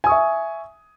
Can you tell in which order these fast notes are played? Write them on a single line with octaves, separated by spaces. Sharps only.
G#5 D#6 C#6 E5